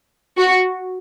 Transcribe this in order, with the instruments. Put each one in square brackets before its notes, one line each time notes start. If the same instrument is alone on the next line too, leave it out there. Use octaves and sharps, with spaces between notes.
[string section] F#4